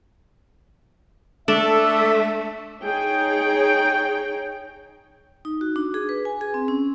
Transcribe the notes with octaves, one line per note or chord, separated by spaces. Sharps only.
A3 D4 A4 E5
D#4 G#4 C#5 G5
D#4
F#4
D4
G#4
B4
G#5
G#4
C4
C#4